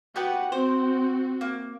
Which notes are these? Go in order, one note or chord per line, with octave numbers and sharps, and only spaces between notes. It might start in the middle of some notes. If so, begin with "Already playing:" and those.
B3 F#4 G4 B4 F#5
C4 F#4 C5
A#3